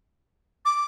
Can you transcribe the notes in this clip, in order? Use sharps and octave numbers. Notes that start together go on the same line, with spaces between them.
D6